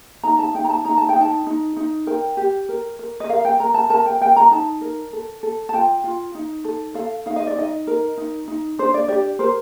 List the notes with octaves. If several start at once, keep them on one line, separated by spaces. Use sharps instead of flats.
D#4 A#5
A5
D#4 G5
A#5
A5
D#4 A#5
A5
G5
D#4 A5
D#4
D#4
A#4 G5
G4
A#4
A#4
D#5
A#4 F5
G5
A#4 A#5
A5
A#4 A5
G5
A#4 G5
A#5
D#4 A5
A#4
A4
A4
A5
F4 G5
F4
D#4
A4
A4 F5
D#4 F5
D#5
D5
D#4 D#5
A#4
D#4
D#4
D4 C5
D5
G4 D5
A#4 C5